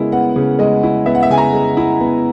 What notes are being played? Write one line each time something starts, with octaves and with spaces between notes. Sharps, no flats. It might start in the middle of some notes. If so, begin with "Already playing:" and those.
Already playing: C#3 G#3 B3 E4 A#4
B3 F#5
C#3
G#3 D#5
E4
B3 E5
F#5
E5
C#3 G#5
A#5
G#3
E4
B3